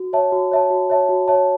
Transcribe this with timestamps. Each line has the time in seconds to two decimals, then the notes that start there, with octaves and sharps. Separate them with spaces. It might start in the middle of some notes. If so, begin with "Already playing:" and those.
Already playing: F#4
0.13 C#5 E5 A5
0.32 F#4
0.52 C#5 E5 A5
0.70 F#4
0.90 C#5 E5 A5
1.09 F#4
1.28 C#5 E5 A5